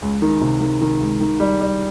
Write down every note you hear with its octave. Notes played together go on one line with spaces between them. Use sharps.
C#2
D#3
C3
D#3
D#3
C#2
D#3
G3
G3